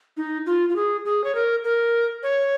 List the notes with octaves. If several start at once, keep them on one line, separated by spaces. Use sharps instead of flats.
D#4
F4
F4
G#4
G#4
C#5
A#4
A#4
C#5